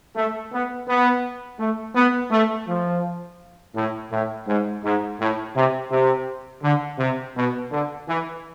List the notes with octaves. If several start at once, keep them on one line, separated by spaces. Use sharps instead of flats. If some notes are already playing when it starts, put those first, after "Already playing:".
A3
B3
B3
A3
B3
A3
F3
A2
A2
G#2
G#2
A2
C3
C3
D3
C3
B2
D3
E3